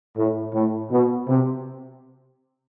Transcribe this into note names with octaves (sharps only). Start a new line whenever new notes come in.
A2
A2
B2
C3